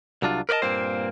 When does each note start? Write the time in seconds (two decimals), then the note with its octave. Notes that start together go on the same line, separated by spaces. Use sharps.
0.22 C2 F#3 D4 F4
0.49 A#4 B4 D5 D#5 A5
0.62 G2 A#2 A#3 C4 C5